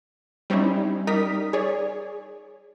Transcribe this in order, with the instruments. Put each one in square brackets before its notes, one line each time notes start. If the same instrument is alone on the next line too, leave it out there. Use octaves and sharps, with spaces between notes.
[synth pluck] G3 C4 C#4 D#4 E4
G3 D#4 A#4 D#6 B6
G#4 C#5 D5